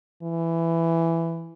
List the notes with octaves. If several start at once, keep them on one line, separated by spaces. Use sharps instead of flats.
E3